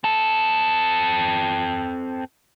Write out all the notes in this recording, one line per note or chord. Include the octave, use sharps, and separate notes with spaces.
C4 A4